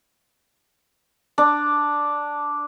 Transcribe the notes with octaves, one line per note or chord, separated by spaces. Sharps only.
D4